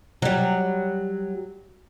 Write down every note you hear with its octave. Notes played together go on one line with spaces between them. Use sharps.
F#3 G3